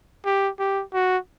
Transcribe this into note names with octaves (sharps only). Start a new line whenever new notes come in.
G4
G4
F#4